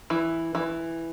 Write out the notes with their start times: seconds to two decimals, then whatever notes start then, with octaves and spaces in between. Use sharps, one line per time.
0.10 E3
0.55 E3